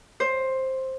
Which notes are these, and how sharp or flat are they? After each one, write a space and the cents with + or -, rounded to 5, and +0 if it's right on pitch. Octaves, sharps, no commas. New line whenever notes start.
C5 +10